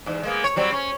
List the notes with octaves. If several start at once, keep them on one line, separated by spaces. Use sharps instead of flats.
E2 G#2
G#3 A#3 B3
C#5
F#3 G3 C4
C#4